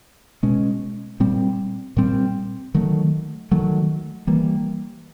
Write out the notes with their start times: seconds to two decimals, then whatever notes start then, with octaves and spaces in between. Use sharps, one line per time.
0.43 B2 G#3 C#4
1.20 A#2 G3 C4
1.97 A#2 G3 C4
2.74 D#3 F#3 A3
3.51 D#3 F#3 A3
4.27 E3 G3 A#3